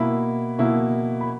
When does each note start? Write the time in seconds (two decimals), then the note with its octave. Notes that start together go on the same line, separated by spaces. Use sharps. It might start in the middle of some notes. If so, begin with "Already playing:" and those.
Already playing: B2 A#3 E4 B5
0.58 B2 A#3 E4
1.21 B5